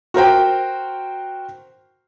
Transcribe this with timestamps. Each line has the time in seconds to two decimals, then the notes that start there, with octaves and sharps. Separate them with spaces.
0.14 F#4 A#4 C5 G5